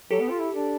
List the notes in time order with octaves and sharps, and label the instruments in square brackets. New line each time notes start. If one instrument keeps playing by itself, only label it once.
[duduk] F#3 [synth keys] G4 A4
[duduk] B3
F4
E4
D4